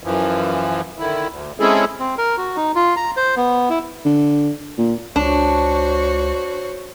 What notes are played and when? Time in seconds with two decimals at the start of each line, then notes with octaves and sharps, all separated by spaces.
0.04 F#2 E3 F3
0.99 D3 D#3 E4
1.29 D2
1.60 G#3 C4 C#4 E4 G#4 A4
1.99 C4
2.18 A#4
2.37 F#4
2.56 D#4
2.75 F4
2.96 A#5
3.16 C5
3.36 B3
3.70 E4
4.05 D3
4.78 A#2
5.16 C#2 D4 F#4 C5 C#5